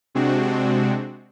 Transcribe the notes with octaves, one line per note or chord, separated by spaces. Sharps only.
C3 G#3 C4 D4 F#4